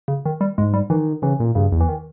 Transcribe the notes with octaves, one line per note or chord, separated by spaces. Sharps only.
C#3
D#3
G3
G#2 G#3
G3
D#3 E3
C#3 E3
A#2
G2 C#3
E2
E3
D#3